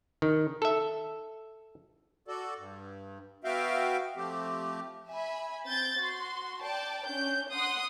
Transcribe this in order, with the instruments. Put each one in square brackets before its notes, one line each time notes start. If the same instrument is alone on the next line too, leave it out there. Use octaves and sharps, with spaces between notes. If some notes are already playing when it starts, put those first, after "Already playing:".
[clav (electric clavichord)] D#3
A4 E5
[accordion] F#4 A4 D5
G2
B3 F#4 E5 F5 G5
F3 A3 C4 G4
[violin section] E5 G#5 B5
C4 G6 A6
F#4 C6
D5 G5 A5
C#4 D4 G6
F#5 C6 D#6